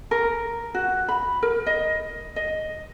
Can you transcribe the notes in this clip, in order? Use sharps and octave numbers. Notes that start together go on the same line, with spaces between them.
A#4
F#4
B5
A#4
D#5
D#5